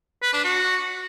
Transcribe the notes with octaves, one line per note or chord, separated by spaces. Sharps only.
B4
D4
F#4